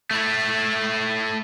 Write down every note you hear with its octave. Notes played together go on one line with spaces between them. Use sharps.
A3 E4